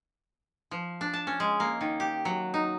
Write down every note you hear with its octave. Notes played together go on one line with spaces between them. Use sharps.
F3
D4
A5
C#4
G#3
A#3
D#3
G4
F#3
D#4